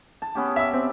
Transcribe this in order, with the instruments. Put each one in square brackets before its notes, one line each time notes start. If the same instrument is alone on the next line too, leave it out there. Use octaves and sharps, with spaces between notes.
[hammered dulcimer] A5
B3 C#4 G4
[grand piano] E5 E6
C4